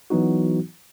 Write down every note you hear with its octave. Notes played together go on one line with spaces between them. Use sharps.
E3 F#3 B3 D#4 F#4